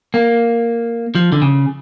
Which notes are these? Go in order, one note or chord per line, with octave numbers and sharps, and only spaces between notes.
A#3
F3
D3
C#3